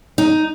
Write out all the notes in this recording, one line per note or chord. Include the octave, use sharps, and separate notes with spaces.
D#4